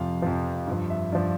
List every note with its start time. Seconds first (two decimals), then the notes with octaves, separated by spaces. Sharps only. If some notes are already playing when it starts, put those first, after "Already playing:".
Already playing: F2 C3 F3 F5
0.22 F2 C3 F3
0.67 G2 F3
0.90 E5
1.12 G2 F3 D5